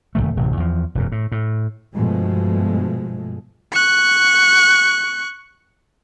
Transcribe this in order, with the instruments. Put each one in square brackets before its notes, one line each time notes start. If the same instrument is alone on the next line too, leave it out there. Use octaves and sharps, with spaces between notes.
[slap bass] F1 D#2 D#3 A3
D1 A1 C3
E2 F3
E1 F#2 A#2
A2
A2
[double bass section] G2 B2 F3 G#3 A3
[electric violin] C#6 F#6